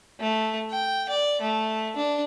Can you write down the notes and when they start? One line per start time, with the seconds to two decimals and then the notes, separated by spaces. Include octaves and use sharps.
0.20 A3
0.70 G5
1.09 D5
1.41 A3
1.96 D4